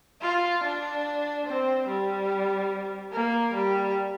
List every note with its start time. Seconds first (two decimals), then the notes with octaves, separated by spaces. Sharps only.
0.21 F4
0.64 D4
1.46 C4
1.88 G3
3.12 A#3
3.54 G3